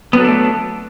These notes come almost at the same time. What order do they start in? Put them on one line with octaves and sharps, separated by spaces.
B3 F#3 A4 D4 A3